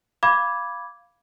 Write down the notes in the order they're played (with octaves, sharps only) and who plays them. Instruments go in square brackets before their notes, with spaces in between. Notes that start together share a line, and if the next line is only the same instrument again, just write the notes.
[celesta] F5 B5 D6 G#6